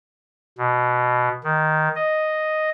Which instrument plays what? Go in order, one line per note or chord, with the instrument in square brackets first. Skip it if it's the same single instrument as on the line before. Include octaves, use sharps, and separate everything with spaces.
[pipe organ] B2
D#3
D#5